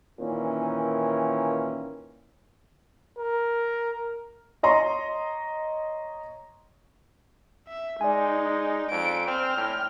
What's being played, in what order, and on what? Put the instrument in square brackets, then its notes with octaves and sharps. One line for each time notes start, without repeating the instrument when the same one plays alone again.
[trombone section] A#2 D#3 E3 C#4
[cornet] A#4
[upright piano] C#5 D#5 A#5 C6 C#6
[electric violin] E5
[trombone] G#3 [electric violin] D#4 [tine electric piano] D5 G#5
[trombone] F2 [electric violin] D7
[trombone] C4 [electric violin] G5 F6
[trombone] A2